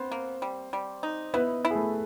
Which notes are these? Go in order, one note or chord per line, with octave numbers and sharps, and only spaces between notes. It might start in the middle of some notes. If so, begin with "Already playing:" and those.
Already playing: B3 C4 C5
A#3
G3
G3
D#4
B3 E4 B4
E4
G#4
A3 A4